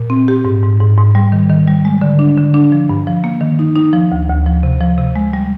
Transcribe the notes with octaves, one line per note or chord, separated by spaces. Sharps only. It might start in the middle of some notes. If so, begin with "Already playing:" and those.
Already playing: A#2
C4
G4
G#2
G#2
G#2
G#2
G3
D#3
D#3
G3
G#3
D3
D4
D3
D4
F3
G2
F3
A#3
D#3
D#4
D#4
F3
D2
D2
F3
C3
F3
C3
G#3
G3